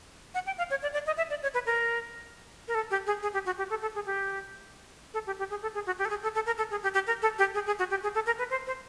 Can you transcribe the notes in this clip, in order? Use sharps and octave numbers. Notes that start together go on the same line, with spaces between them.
F#5
G5
F5
C#5
D5
D5
D#5
E5
D5
C#5
B4
A#4
A#4
A4
G4
G#4
G#4
G4
F#4
G4
A4
A4
G#4
G4
A4
G4
G4
G#4
A4
G#4
F#4
G4
A4
G#4
A4
A4
A#4
A4
G#4
G4
G4
A#4
A4
G4
G#4
G#4
F#4
G4
G#4
A4
A#4
B4
C5
C5